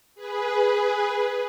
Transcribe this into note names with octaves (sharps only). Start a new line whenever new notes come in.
G#4 B4